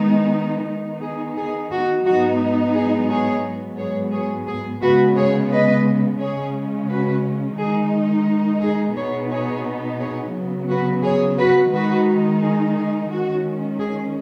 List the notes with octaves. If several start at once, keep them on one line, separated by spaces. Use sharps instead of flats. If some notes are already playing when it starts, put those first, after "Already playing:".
Already playing: D#3 G#3 B3 D#4
D#3 B3 D#4
G#4
G#4
F#4
G#2 F#3 B3 D#4 F#4
G#4
G#4 C#5
G#2 F#3 B3
G#4 C#5
G#4 C#5
G#4
C#3 G#3 B3 F#4 B4
G#4 C#5
B4 D#5
C#3 G#3 C#4 G#4 C#5
F#4 B4
D#3 G#3 D#4 G#4
G#4
B2 B3 D#4 G#4 C#5
G#4 C#5
G#4 C#5
C#3 F#3 B3
F#4 B4
G#4 C#5
F#4 B4
D#3 G#3 D#4 F#4 B4
G#4
G#4
D#3 G#3 C#4 F#4
G#4